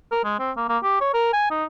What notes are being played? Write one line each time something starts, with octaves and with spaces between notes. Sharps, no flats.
A#4
G#3
C4
A#3
A#3
G4
C#5
A#4
G#5
D#4